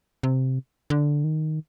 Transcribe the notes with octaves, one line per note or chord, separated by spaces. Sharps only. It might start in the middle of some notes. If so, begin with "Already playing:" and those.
C3
D3
D#3